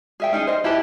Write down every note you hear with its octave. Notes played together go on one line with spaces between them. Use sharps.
G#4 E5 G5
C#4 D#4 G#4
C5 D#5
E4 G4 B4 A5